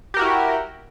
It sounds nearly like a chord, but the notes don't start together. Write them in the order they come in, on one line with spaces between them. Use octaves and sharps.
G4 A#4 F#4 E4